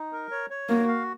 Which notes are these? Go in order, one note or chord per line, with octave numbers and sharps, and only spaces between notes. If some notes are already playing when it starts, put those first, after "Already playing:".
Already playing: D#4
A#4
C#5
C#5
A#3 F#4
F5